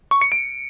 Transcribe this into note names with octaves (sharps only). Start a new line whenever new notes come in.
C#6
C#7
D7